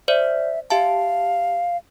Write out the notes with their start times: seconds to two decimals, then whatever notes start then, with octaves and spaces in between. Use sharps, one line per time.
0.08 C5 D5 E5
0.70 G4 E5 F5 A5